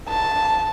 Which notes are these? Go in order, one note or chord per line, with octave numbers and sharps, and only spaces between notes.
A5